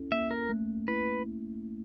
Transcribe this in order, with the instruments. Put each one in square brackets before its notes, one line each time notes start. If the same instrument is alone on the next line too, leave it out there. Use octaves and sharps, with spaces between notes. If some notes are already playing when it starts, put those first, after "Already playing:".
Already playing: [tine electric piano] C#4 E4 A4
[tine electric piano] A#3 [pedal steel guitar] E5
[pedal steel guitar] A#4
[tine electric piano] A3
[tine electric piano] E4 [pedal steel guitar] B4